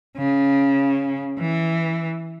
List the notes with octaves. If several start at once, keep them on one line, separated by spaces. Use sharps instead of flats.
C#3
E3